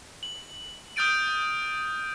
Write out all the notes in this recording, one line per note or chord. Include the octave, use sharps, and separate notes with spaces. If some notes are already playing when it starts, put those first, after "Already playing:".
F#7
D#6 F6 G6 A6 D7 D#7